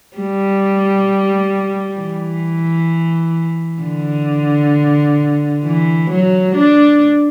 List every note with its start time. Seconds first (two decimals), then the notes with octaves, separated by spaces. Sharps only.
0.17 G3
1.99 E3
3.82 D3
5.64 E3
6.10 F#3
6.55 D4